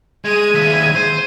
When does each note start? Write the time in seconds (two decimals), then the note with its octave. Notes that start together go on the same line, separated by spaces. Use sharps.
0.24 G#3 G#4 G#6 D#7
0.54 D#2 E5
0.96 C5